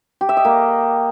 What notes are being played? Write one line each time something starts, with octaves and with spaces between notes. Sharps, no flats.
G4
E5
D#5
A#3